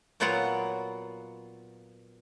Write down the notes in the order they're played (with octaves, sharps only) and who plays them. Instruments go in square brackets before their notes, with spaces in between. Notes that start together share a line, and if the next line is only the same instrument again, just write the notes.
[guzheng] A#2 F#3 B3 F4 A#4 F#5